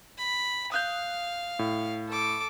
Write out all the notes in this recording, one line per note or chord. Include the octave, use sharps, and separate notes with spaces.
B5
F5 D#6 F#6 G6
A2
A4 D6